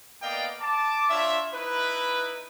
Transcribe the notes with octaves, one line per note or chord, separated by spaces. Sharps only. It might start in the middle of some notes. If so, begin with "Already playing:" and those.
A#3 B3 D5 D#5 F5 G5
A5 D6
D4 F4 C#5 E5
D#4 E4 A#4 B4